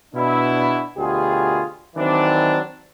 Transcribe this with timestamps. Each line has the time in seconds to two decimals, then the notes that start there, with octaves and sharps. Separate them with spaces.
0.15 B2 D4 E4
0.98 D2 B2 F4 G4 G#4
1.96 D#3 E3 F#3 C4 D4